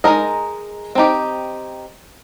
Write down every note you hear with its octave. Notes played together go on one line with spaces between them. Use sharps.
G#3 D#4 A#4 D#5
C4 D#4 G4